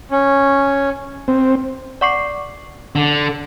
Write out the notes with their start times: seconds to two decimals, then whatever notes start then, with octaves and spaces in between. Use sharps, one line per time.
0.11 C#4
1.28 C4
2.01 D5 F#5 C#6 D6 C7
2.95 D3